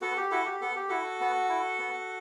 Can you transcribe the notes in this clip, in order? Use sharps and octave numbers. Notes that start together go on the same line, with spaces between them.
B3 F#4 A4
G4
E4 F#4 A4
G4
B3 A4
G4
E4 F#4 A4
B3
E4
B3